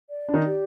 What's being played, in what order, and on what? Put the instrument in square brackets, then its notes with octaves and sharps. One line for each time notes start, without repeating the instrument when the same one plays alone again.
[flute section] D5
[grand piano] D4
D#3 D#4
[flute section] G4